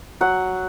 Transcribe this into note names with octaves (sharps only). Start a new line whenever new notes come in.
F#3 F#5